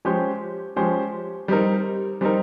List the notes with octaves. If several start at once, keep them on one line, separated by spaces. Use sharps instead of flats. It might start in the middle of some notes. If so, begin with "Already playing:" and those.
F3 G#3 C#4 G4 C5
F3 G#3 C#4 G4 C5
G3 C4 D#4 A#4
G3 C4 D#4 A#4